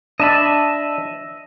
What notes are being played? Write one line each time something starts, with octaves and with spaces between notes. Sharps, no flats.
D4 D#5 E5 A5 B5